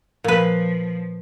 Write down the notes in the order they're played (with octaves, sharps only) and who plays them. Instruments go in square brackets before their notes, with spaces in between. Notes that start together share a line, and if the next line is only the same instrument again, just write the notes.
[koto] A#2 B4 [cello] F3